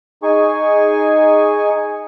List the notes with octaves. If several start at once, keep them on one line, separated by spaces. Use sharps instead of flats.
D#4 G#4 G#5 C#6